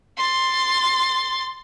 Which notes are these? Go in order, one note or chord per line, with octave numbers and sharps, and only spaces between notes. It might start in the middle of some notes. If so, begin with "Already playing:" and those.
C6 A6